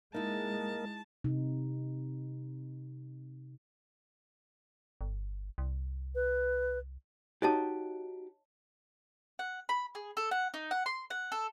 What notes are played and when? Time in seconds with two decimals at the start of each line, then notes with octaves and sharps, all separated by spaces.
0.14 G#3 A#3 D#4 E4 A#4 D#5 A5
1.24 C3 D#4
5.01 G1
5.58 C2
6.15 B4
7.42 D#4 F#4 G4 C#5 D#5 A5
9.39 F#5
9.69 B5
9.95 G#4
10.17 A4
10.31 F#5
10.54 D#4
10.71 F#5
10.86 C6
11.10 F#5
11.32 A4